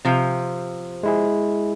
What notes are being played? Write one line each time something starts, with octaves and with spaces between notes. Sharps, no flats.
C3 F3
G#3 E4 G#4